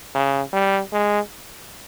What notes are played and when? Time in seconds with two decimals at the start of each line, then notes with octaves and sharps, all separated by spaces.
0.15 C#3
0.53 G3
0.92 G#3